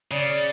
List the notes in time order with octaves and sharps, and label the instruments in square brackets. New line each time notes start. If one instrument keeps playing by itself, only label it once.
[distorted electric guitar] C#3 [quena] D5